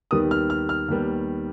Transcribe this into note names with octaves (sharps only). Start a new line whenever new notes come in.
D#2 D#3 G3 B3 D#6
F6
F6
F6
D#2 D#3 G3 B3